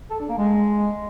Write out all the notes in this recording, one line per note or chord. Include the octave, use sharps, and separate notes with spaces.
A4
D4
A#3
G#3